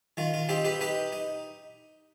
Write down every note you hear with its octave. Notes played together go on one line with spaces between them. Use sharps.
D#3 F4
F4
C4 D#4 G4
G4 B4
D#4 G4 B4
D#4